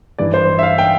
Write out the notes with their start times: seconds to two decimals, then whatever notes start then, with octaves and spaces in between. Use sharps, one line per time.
0.18 G2 E3 G3 D5
0.34 C5
0.59 E5
0.63 F5
0.78 G5